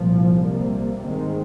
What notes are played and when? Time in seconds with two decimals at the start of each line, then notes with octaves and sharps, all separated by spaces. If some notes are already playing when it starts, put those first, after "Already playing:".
Already playing: C2 A#2 F3
0.38 C2 C3 G3 A#3
1.02 G#2 D#3 G#3 C4